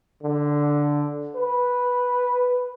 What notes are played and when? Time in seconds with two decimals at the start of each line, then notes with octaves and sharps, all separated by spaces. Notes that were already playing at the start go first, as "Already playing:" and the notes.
0.23 D3
1.35 B4